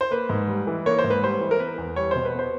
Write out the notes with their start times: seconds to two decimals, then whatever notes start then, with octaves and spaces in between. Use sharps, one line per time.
0.01 C5
0.11 A#3 B4
0.29 G#2
0.48 G3
0.67 E3
0.86 A#3 C#5
0.99 C5
1.04 G#2
1.10 B4
1.23 G3 C5
1.41 E3
1.51 A#4
1.60 B3 B4
1.78 E2
1.96 G3 C#5
2.11 B2 C5
2.25 B4
2.34 B3 C5